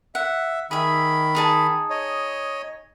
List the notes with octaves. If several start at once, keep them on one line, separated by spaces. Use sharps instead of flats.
E5 F#5
D#3 G#4 E5 B5
D#4 G#4 A5
C#5 D#5